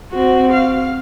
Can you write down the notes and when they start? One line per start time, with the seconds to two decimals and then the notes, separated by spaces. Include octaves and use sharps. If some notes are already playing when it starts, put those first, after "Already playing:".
0.12 C4 F#4
0.52 F5